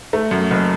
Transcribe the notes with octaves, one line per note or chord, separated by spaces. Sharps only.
A3
F#2
F#1